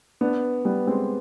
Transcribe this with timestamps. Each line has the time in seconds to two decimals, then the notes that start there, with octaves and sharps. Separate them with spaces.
0.21 B3 D4
0.65 G3 B3
0.87 G#3 C4